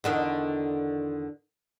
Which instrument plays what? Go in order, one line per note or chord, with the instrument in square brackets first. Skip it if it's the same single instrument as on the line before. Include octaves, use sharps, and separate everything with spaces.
[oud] E2 D3 D#3